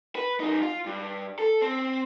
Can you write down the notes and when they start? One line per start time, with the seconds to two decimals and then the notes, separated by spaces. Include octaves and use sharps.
0.15 B4
0.40 F#2 D#4
0.63 F4
0.86 G2
1.39 A4
1.62 C4